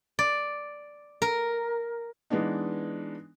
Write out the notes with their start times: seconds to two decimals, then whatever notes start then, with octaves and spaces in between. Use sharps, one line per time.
0.19 D5
1.22 A#4
2.30 E3 G#3 B3 D4 D#4